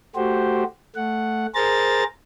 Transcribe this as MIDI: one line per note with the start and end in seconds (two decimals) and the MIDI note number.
0.16 0.64 57
0.16 0.64 66
0.16 0.64 67
0.16 0.64 72
0.96 1.47 57
0.96 1.47 78
1.55 2.04 68
1.55 2.04 70
1.55 2.04 72
1.55 2.04 82
1.55 2.04 93